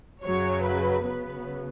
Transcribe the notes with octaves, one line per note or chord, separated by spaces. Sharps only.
F#2 C#3 F#3 C#5
B4
C#3 F#3 B3 B4